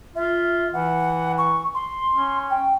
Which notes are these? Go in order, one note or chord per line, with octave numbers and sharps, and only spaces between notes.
F4 E5
E3 F#5
C#6
C6
C#4
G5